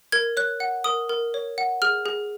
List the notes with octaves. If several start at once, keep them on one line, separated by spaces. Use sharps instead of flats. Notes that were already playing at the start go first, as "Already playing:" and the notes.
A#4 G#6
C#5 F#6
F#5
A#4 D#6
A#4
C#5
F#5
G#4 F6
G#4